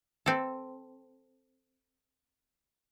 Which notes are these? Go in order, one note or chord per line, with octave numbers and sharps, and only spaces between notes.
C4 A4